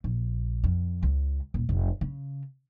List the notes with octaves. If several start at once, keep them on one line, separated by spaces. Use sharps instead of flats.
A#1
F2
C#2
D#1
F1
C#3